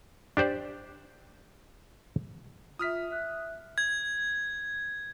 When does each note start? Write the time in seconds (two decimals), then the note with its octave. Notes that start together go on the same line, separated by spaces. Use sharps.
0.37 D4 G4 C5 D5
2.79 F4 E5 D#6 F6 B6
3.11 E5 F#6
3.78 G#6